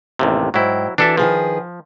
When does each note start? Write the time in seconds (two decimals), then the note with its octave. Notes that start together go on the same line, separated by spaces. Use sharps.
0.19 A1 D#2 C3
0.54 G#2 F#3 E4 G5
0.98 E3 D4 F#4 A4 E5
1.17 D#3 F3 G#4 B4